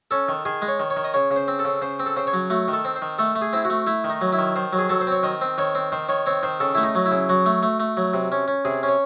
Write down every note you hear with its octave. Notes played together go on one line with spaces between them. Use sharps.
C#4 A4
D#3
D#3 G#4
G#3
C#5
D#3
C#5
D#3
D#5
C#3 C#5
C#3
C5
C4
A4
C#3
C#3 C5
C4
A4
C#3 C5
C#5
F#3
A3 F#4
D#3
A4
C4
C5
D#3
A3 A4
A3
G#4
C4 E4
F#4
A3
A3 E4
D#3
D#4
F#3
E4
D#3
D#3 C5
F#3
G#4
F#3 A4
C5
C4 C#5
D#3 D#5
C4
D#3 C#5
C4
D#3 C5
D#3 C#5
C4 C#5
D#3 C5
C#3 A4
A3 E4
D#4
F#3
E4
C#3
F#3 F#4
A3
A3
A3
F#3
C3
C#4
C#4
C3 G#4
C#4
C#5